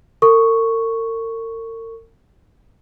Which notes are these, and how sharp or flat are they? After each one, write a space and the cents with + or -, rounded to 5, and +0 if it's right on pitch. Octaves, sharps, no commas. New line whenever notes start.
A#4 -45 C#6 +0